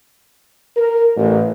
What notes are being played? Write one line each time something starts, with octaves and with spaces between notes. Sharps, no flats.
A#4
A1